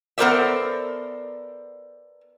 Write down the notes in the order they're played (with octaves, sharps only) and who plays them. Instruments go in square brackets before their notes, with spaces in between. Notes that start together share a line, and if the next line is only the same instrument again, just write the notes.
[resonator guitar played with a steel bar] B3 A4 A#4 C5 D5 E5